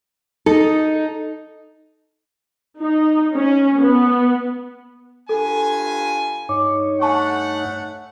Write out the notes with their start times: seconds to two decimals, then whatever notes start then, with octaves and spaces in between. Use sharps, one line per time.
0.46 D#4 A4
2.80 D#4
3.35 C#4
3.81 B3
5.29 G2 F4 A4 G#5
6.49 G2 D#4 C#5 D6
7.01 A3 F#5 G#5 A5 C#6